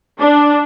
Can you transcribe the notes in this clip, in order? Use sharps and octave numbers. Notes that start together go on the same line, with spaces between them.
D4